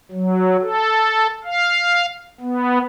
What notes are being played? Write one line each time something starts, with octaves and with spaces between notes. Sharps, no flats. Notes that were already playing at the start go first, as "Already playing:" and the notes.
F#3
A4
F5
B3